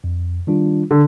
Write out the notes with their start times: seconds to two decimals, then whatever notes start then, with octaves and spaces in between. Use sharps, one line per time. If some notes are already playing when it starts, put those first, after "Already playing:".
0.04 F2
0.47 D#3 G3 D4 F4
0.91 D3